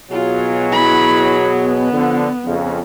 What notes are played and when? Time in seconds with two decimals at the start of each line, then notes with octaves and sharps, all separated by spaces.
0.11 B2 F#3 F4 G#4
0.72 E4 B5
1.40 B3
1.93 D3 F3
2.46 F2 C#3